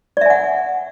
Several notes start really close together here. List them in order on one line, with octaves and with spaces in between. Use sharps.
D5 E5 G#5 F#5